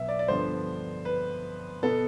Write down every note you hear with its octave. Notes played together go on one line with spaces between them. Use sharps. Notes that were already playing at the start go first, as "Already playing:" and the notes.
Already playing: B1 B2 B3 E5
D5
D5
G2 D3 F3 B3 C5
B4
B2 B3 A4